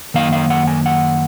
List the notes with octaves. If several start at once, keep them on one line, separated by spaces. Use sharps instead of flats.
F#2 D#3 A#3 F5
F5
F#5
G#5
F#5